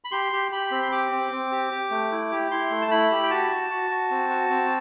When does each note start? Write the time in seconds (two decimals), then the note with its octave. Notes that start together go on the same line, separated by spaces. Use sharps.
0.05 B5
0.11 G4 C6
0.33 G4
0.52 G4 B5
0.71 C4
0.83 C6
0.92 G4 D6
1.11 C4
1.32 C4
1.52 G4
1.71 G4
1.91 A3
2.11 E4
2.32 G4
2.51 E4 C6
2.70 A3
2.82 A5
2.91 E4 B5
3.11 G4
3.23 G5
3.30 F#4 A5
3.51 F#4
3.71 F#4
3.91 F#4
4.11 C4
4.30 F#4
4.50 C4